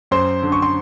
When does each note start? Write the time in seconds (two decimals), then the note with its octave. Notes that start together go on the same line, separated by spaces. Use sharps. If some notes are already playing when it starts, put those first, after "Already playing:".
0.11 F#2 C5 C6
0.43 D3
0.52 C#6
0.62 C6